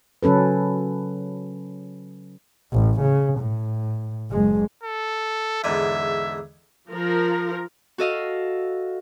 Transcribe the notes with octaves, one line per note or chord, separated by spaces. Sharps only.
C#3 F#3 C#4 A4 B4
A1
C#3
A2
F#1 G#3
A4
E2 G#2 D3 E5
F3 A#4
F#4 A4 D#5 F5